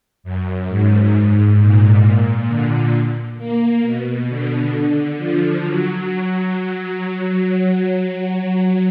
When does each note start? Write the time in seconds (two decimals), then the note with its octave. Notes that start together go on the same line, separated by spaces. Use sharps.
0.24 F#2
0.69 G#2
1.58 A#2
2.48 D3
3.38 A#3
3.82 B2
4.28 D3
5.18 F3
5.62 F#3